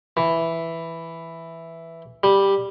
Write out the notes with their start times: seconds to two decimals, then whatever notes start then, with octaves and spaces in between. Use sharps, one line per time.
0.17 E3
2.23 G3